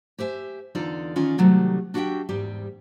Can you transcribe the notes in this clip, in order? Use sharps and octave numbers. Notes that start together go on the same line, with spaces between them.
G4 C5 E5 G#5
E2 D3 D#4 F4 A4 D5
D#3 C#4 F4 D5 D#5 G#5
C3 D#3 F#3 G3 A3
D4 F#4 G4 D#5 E5 G5
E2 G#2 G3 G4